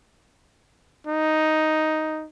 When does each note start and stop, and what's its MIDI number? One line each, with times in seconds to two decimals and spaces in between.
1.07 2.26 63